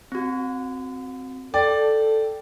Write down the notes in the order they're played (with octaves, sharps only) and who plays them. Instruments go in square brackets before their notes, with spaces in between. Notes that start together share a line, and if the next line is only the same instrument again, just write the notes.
[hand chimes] C4 F#4
[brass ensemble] A4 [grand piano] D5 [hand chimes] G5